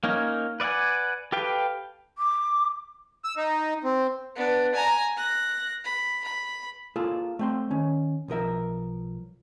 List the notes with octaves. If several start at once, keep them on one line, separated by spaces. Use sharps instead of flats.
A#3 C#4 D#4 C#5
B4 D5 E5 F#5 G#5
G4 A4 B4 F5 G5
D6
E6
D#4
C4
B3 D4
G#5 A#5
F#6 A#6
B5
B5
A#3 F4 G#4 A4
A3 C4 C6
D#3 C#4
B1 F3 A#4 E5